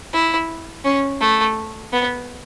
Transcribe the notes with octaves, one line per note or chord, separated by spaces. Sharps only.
E4
C#4
A3
B3